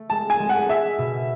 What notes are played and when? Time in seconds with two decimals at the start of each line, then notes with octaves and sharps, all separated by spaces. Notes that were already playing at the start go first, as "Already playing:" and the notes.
Already playing: A3
0.10 G#3 A5
0.30 G#5
0.40 G#3
0.49 F#5
0.69 G#3 E5
0.98 B2